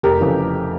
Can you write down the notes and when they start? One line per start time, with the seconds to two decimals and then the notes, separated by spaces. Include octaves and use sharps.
0.03 F1 G4 A#4
0.21 F2 C#3 E3